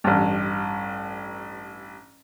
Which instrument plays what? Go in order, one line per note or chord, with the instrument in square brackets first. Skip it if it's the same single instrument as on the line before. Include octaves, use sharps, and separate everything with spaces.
[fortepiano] A1 G2